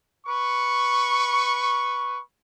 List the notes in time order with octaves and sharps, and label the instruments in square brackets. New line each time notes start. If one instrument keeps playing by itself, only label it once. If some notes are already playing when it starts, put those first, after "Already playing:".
[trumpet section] B4 C#6